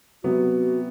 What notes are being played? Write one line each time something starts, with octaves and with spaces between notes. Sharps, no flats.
C3 F#3 B3 F#4